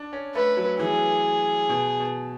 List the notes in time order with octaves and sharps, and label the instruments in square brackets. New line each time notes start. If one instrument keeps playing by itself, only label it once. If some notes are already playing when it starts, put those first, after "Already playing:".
Already playing: [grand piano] D4
C#4
[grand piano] A3 [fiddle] B4
[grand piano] F#3
[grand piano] E3 [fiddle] G#4
[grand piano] B2
B2